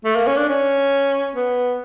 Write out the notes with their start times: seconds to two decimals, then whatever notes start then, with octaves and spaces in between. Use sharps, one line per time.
0.05 A3
0.16 A#3
0.27 C#4
0.37 D4
0.49 C#4
1.35 B3